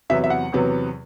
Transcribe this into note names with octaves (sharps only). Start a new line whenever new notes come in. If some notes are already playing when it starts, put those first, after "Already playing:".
E2 C3 F#3 B3 E5
E5
F#5
E2 C3 F#3 B3